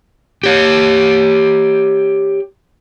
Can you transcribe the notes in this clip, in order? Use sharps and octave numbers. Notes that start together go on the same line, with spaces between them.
G4 C#5